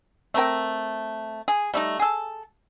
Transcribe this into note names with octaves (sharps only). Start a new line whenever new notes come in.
A3 C4 A#4 G5
G#4
G3 A3 D#4
G#4 A4